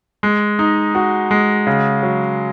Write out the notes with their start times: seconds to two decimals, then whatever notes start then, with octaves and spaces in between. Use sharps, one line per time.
0.23 G#3
0.59 D#4
0.95 F#4
1.31 G#3
1.67 C#3
2.03 F#3